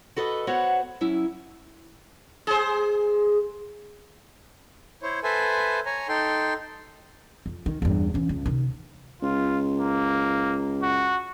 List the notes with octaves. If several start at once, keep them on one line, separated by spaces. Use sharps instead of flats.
F#4 A4 B4 D#5
B3 F#4 C5 C#5 F#5
F#3 C#4 E4
G#4 C5
E4 C5 C#5
A4 B4 C5 E5 G#5
C#5 G#5 A#5
D#4 A4 G5 C6
F2
D#3
E2 G2
E3 C#4
C#2
C3 D#3
C#2 F4
A#3
F#4